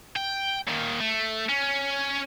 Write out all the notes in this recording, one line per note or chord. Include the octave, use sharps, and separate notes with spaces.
G5
A#2 D#3
A3
C#4